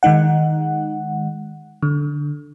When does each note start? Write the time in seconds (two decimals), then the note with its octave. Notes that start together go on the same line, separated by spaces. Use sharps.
0.03 D#3 G#3 D#4 F#5
1.83 D3